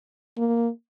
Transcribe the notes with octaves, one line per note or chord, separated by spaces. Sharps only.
A#3